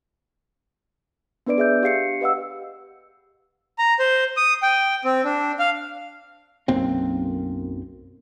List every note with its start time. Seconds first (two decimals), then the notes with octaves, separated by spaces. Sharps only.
1.46 B3 D4 B4 D5 D7
1.58 G#4 E5 G6
1.83 G4 F5 C7 C#7
2.21 G4 B4 D#5 F5 F#5 E6
3.78 A#5
3.99 C5
4.37 D#6
4.63 G5
5.05 C4
5.24 D4
5.59 F5
6.68 B1 F#2 A#3 C4